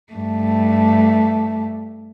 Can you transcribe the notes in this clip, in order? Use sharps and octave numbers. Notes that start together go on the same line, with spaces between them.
G2 A3